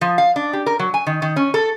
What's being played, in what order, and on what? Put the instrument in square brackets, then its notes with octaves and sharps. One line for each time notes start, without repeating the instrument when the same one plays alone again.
[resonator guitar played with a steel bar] F3
F5
D4
G4
A#4
F#3
G#5
D#3
D#3
C#4
A4